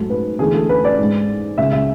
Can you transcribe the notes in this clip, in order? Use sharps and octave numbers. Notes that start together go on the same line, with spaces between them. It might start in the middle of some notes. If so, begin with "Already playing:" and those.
Already playing: G#2 F#3 A3
B4
E2 D3 A3 G#4
A4
B4
D5
G#2 G#3
C#2 C#3 G#3 E5
E5